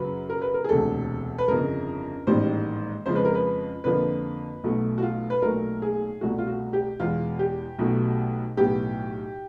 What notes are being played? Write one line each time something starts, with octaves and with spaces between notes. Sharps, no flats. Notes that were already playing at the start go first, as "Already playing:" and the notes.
Already playing: F#2 C#3 F#3 B4
A#4
B4
A#4
G#4
E1 D2 C3 A4
B4
G1 F2 C#3 A#4
A1 G#2 D#3 G3 A#3 C5
F2 C#3 F3 G#3 C5
B4
A#4
B4
F2 D3 F3 A#3 B4
B1 B2 F#3 A3
F#4
F4
B4
B1 A#2 F#3 A3 A#4
G#4
C2 B2 F#3 A3 F#4
F4
F#4
G4
E2 B2 G#3 F4
G4
B1 B2 F#3 A3
B1 A2 F#3 B3 G4